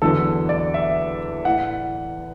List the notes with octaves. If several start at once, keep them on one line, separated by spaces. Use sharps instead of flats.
E2 D3 F#3 A4
D5
E5
A2 F#5